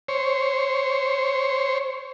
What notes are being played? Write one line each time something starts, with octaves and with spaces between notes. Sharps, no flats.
C5 C#5